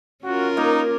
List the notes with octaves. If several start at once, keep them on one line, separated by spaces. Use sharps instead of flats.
C#4 F4 F#4 A#4
A#3 D#4